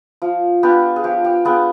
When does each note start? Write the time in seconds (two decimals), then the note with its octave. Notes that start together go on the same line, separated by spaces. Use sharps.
0.22 F3 F4
0.63 B3 D4 F4 G4
0.96 G#4
1.04 F3 G4
1.24 G4
1.45 B3 D4 F4 G#4